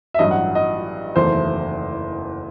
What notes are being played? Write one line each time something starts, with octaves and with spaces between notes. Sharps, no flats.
E5
A1 G2 F#3 D#5
F#5
D#5
F#1 E2 D#3 A3 C5